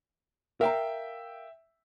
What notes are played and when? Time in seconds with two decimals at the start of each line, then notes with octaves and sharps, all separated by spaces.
0.61 A#4 E5 F5 G5 A#5